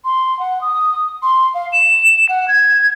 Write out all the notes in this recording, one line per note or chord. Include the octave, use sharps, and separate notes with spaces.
C6
F#5
D#6
C6
F5
E7
F#5
G#6